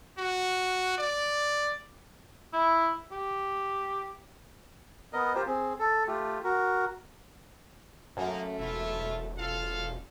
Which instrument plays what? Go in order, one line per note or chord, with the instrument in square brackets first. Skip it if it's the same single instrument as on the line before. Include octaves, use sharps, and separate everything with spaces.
[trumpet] F#4
D5
[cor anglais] E4
G4
[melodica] B3 A#4 D#5
F4 G4 A#4 C5
C4 G#4
A4
A3 F4 G4
F#4 A#4
[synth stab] F#2 [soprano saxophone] A3 [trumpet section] A#3 D#4
[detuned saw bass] E1 [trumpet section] E4 F4 E5
[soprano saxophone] F4 [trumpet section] A4 F5